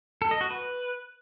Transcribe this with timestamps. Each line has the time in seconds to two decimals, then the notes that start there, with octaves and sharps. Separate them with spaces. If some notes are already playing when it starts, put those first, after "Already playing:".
0.22 A4
0.31 D#5
0.41 F#4
0.50 B4